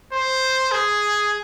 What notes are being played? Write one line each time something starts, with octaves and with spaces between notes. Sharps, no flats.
C5
G#4